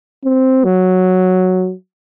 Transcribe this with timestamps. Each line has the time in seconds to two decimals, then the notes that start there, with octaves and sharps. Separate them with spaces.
0.25 C4
0.64 F#3